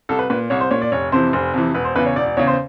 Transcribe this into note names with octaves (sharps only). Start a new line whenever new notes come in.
C2 A4
B4
A#2 B4
C2 C#5
C5
A#2 C#5
D5
F1 C#5
F2 C3 E3 C5
F1 C5
F2 C3 E3
E1 B4
C5
E2 C#3 B4
C#5
E1 D5
D5
E2 C#3 C#5
C5